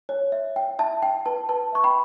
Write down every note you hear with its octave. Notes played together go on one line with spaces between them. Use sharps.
C#5
E5
G5
E5 A5
G5
B4 A5
B4 A5
E5 C#6
G5 B5